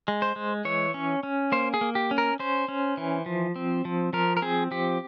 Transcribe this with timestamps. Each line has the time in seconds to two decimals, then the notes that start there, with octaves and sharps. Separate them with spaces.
0.08 G#3
0.22 C5
0.36 G#3
0.65 E3 C#5
0.94 C#4
1.23 C#4
1.52 A#3 C5
1.74 G#4
1.81 A#3
1.95 G4
2.11 C#4
2.18 A#4
2.39 C#4 C5
2.68 C#4
2.97 E3
3.26 F3
3.56 C4
3.85 F3
4.13 F3 A#4
4.37 A#4
4.42 C4 G#4
4.71 F3 G4